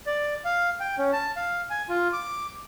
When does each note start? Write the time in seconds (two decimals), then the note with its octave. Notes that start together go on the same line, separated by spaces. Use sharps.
0.06 D5
0.45 F5
0.80 G5
0.98 C#4
1.13 A5
1.36 F5
1.70 G#5
1.89 F4
2.13 D6